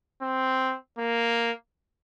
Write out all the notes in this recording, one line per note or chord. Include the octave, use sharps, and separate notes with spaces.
C4
A#3